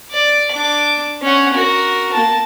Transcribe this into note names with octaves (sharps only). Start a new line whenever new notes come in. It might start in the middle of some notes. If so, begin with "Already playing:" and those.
D5
D4 D6
C#4 F#5
F#4 A#4
A#3 A5